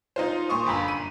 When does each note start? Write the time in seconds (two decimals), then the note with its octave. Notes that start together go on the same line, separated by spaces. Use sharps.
0.16 D#4 F4 C5
0.49 A#2 C6 C#6 D#6
0.66 G1 F#2 A#5 B5
0.88 D#7